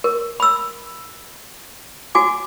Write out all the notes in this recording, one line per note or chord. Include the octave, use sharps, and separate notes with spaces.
A#4
B5 E6
F#4 G#5 D6